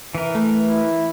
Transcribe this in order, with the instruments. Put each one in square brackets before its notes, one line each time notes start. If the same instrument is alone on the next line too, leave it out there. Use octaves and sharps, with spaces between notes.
[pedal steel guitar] E3 A#4 [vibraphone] B4 E5
[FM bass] A3
[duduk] E4